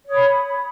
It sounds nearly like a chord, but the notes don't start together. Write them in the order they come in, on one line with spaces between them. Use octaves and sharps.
C#5 D#6 B5